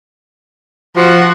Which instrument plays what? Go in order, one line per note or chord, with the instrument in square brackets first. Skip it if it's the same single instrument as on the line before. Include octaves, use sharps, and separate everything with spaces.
[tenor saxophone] F3 [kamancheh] F#4 F#5